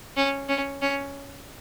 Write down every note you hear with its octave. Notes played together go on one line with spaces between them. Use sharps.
C#4
C#4
C#4